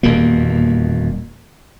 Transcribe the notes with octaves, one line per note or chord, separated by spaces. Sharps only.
D#1 E2 B2 A#3